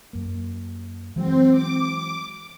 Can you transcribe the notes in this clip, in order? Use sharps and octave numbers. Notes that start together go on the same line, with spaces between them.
F#2 A#3
E3 F#3 G#3 C4
D6